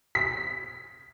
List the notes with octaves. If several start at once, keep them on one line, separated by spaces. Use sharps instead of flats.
B6